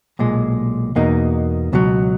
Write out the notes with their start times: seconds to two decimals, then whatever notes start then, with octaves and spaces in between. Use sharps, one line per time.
0.19 B1 A#2 G#3
0.96 E2 B2 A#3 D#4
1.73 C#2 B2 F#3